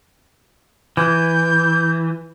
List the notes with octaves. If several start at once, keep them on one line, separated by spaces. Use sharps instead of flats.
E3 G6